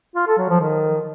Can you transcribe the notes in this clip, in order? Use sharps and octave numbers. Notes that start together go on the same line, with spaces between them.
F4
A4
F#3
F3
D#3